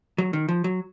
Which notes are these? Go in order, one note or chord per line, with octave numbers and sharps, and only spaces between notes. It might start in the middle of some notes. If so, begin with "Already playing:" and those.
F#3
D#3
F3
F#3